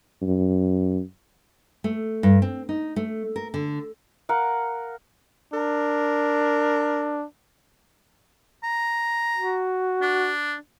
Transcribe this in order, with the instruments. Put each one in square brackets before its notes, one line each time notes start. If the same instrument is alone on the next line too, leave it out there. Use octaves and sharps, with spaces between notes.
[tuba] F#2
[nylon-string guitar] A3
G2
C4
D#4
A3
A#4
D3
[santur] A#4 F5 F#5
[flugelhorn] D4 [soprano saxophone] A#4
[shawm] A#5
[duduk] F#4
[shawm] D4